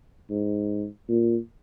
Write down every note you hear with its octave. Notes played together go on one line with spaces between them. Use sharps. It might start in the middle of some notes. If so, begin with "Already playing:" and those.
G#2
A#2